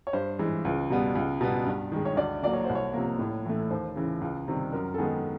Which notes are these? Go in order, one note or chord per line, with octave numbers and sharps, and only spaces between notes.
C#5
G2 C5
E3 G#3
C#2
B2 G3 B3
C#2
B2 G3 B3
G2
D#3 G#3
C#5
D2 D5
D3 F#3 A#3 D5
C#5
C2 C5
C#5
C3 F3 A#3
A2
E3 A3
D#2 C5
C#3 E3
C#2
C3 D#3 G3
F#2 A#4
A4
D#3 G#3 B3 G#4